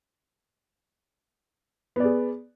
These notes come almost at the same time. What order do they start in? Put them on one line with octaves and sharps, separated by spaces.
B3 D5 G#4